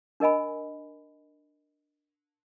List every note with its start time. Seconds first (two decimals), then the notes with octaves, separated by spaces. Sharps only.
0.20 D4 A#4 D#5 G#5 B5